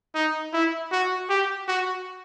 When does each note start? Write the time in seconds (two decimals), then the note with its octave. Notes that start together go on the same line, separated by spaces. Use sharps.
0.15 D#4
0.53 E4
0.92 F#4
1.30 G4
1.68 F#4